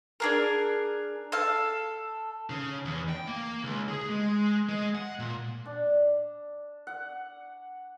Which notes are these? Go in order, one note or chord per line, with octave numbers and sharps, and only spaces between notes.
D4 G#4 A#4
A4 F5
C#3
E2
G5
A#3
C#2
G#4
G#3
G#3
F#5
A#2
D4
F#5